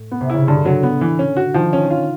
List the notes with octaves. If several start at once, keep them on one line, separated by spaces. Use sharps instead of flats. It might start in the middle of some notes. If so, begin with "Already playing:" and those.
Already playing: A2
B3
C3
C#3 E4
G2 D3
F#3
B3
E3
C#4
F#4
D#3 F3
C#4
F4